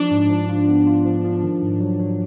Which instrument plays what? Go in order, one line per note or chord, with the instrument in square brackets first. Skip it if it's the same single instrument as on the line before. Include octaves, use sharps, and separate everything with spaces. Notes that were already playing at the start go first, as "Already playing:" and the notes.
Already playing: [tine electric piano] F3 [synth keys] D4
[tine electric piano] G#2
F3
F4
B3
F4
F3
F3
D#3
G#2
F#3
F#3